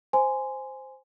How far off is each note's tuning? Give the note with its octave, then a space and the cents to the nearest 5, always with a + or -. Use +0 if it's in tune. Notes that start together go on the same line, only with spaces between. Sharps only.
C5 +0 G#5 +0 C6 -20